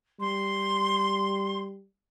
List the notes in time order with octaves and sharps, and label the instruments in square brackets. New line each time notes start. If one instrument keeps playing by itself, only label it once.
[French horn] G3 [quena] C6